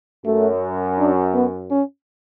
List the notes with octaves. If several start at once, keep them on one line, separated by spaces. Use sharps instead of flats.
F#2 A3
D4
B3
C#4